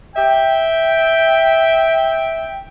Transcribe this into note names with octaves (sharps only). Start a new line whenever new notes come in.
E5 G5